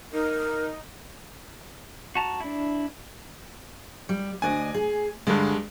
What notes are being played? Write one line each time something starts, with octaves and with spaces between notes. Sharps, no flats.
D#4 A#4
F#4 A5 A#5
D4 E4
G3
D2 D4 D#5 G#5
G#4
G2 D3 G3 G#3 A4